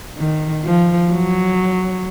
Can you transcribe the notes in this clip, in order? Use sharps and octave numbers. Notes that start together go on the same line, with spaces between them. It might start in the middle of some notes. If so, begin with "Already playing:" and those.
D#3
F3
F#3